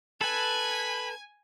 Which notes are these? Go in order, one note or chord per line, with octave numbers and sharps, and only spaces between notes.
A4 B4 G#5 B5 G#6